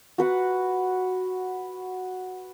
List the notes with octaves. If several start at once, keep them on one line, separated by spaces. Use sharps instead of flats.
F#4 B4 F#5